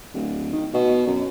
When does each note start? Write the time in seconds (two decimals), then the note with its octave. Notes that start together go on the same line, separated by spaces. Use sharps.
0.14 D1
0.52 D#3
0.74 B2
1.07 F#2